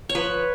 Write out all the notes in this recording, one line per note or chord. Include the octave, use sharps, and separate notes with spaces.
C#5
F3 B4